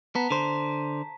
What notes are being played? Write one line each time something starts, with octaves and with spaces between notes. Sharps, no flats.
B3 A5 A#5 B6
D3 C5